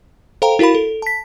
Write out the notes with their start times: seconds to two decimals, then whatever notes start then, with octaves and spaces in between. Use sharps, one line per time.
0.42 A4 C5 F5 G5 A#5
0.59 E4 F#4 A#4 F5 B5
0.75 A4
1.02 A5 B6